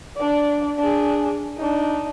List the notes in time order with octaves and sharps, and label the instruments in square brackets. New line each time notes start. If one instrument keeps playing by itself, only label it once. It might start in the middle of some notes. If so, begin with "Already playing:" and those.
[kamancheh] D4 D5
D4 G#4
D4 D#4